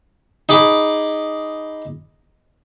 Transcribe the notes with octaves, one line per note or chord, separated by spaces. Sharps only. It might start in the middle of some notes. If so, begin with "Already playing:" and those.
D#4 G#4 B5 D6